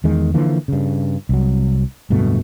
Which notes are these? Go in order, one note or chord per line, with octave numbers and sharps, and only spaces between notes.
E2 D#3 G#3
D3 E3 F3 A#3
G2 C#3
C2 F#3
D1 G2 B2 A3